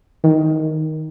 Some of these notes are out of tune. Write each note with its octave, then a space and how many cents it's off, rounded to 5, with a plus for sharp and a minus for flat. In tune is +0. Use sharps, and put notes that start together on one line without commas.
D#3 +10